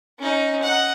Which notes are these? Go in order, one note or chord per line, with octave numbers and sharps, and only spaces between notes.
C#4 D#4
D#5 F#5